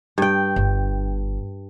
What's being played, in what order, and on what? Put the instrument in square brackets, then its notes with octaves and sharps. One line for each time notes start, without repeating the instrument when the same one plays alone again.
[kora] G2 G5
[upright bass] G1